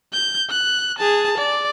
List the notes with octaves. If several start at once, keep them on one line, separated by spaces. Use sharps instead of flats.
G6
F#6
G#4 A5
D5